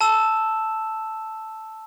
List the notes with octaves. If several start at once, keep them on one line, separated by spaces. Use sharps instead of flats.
A5 E6 E7